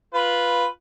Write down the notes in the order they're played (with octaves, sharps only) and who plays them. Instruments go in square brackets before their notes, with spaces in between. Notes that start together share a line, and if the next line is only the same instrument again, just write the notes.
[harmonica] F4 B4